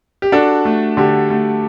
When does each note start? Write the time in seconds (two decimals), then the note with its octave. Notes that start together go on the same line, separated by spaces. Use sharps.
0.22 G4
0.32 D4 F#4 A4
0.65 A3
0.97 D3 G4
1.30 A3